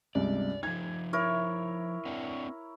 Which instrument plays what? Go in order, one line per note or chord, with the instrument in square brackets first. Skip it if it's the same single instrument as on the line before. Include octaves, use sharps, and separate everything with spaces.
[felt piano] C#2 G2 C3 [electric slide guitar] D5
[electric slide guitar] F3 D#4 [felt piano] G#6
[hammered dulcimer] E4 A#4 C#5
[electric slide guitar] C4 D4 F#5